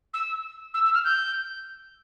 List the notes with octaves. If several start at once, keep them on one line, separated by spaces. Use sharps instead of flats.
E6
E6
E6
F6
G6